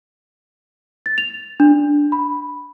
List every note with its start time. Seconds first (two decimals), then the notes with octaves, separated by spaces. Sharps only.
1.06 A6
1.18 F7
1.60 D4
2.12 B5